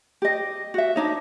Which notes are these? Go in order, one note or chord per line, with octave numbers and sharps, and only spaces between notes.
G4 D#5
F#4 E5
D4 D#4 C#5